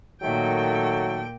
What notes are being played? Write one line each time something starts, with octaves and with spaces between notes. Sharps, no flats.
A#2 D#3 F#3 A3 A4 G5